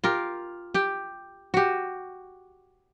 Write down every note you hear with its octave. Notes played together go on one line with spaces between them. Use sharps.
F4 G4 A#4
G4 G5
F#4 G4